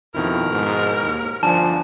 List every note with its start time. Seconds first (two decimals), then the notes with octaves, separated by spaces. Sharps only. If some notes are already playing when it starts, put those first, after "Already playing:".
0.14 F2 B2 D#3 E4 A#4
0.51 G#2
1.03 D#2
1.43 G1 F3 D4 G#5 A5